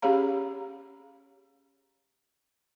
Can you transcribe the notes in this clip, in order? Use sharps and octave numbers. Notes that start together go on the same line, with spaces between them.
C#4 G4 G#4 C#5 F5 A#5